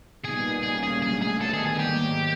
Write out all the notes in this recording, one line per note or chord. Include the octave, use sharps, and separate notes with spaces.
A#2 G3 B3 D#4 G#4
A#2 G3 A#3 C#4 G#4
G#4
D3 F#3 A3 G#4
G#4
D#3 G3 B3 D#4 A4
G#4
G#4
G#2 D#3 F#3 A#3 G4